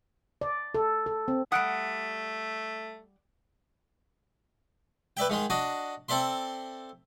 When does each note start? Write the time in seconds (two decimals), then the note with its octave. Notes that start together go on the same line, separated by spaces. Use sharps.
0.41 D5
0.75 A4
1.06 A4
1.28 C4
1.52 G3 A3 F#5 D#6 F#6 D7
5.17 B4 D5 E5 G5
5.30 G#2 D#3 G#3
5.50 D4 F#4 D#5
6.09 C4 A4 D5 E5 C6